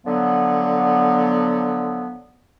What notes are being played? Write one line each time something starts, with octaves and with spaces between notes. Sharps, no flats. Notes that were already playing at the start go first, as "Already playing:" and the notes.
D3 F3 F#3 B3